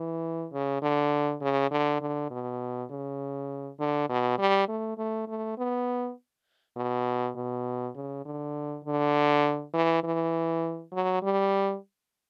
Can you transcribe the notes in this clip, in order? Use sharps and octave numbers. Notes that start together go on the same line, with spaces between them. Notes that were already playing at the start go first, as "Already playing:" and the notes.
Already playing: E3
C#3
D3
C#3
D3
D3
B2
C#3
D3
B2
G3
A3
A3
A3
B3
B2
B2
C#3
D3
D3
E3
E3
F#3
G3